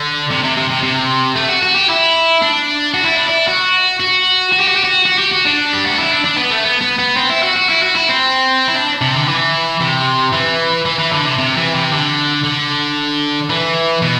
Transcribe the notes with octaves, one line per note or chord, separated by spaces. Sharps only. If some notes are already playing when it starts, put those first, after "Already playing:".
Already playing: D3
C3
C3
C3
C3
C3
A3
F#4
F#4
G4
E4
D4
F#4
E4
D4
E4
F#4
F#4
F#4
G4
F#4
G4
F#4
F#4
G4
F#4
D4
G4
F#4
E4
D4
D4
B3
A3
B3
B3
B3
C4
E4
F#4
F#4
E4
F#4
E4
C4
E4
D4
C3
D3
E3
C3
E3
E3
E3
D3
C3
C3
E3
C3
D3
D3
E3
B2